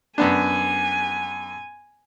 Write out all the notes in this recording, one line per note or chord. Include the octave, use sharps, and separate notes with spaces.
F#2 B3 D4 G#5